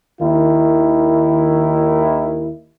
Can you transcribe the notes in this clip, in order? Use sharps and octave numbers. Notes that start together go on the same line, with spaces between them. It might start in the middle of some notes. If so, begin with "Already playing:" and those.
D#2 D#3 E4